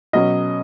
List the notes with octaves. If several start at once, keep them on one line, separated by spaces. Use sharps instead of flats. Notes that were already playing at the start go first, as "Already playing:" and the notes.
B2 F#3 C#4 D#5